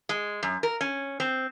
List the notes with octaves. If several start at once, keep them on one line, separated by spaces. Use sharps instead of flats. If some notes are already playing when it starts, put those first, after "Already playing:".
G#3
F#2
A#4
C#4
C4